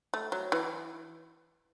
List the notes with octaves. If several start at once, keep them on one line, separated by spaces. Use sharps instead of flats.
A3
F#3
E3